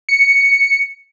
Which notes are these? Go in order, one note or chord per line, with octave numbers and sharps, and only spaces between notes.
C#7